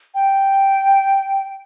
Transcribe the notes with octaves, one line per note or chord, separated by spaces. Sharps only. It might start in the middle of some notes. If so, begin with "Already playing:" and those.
G5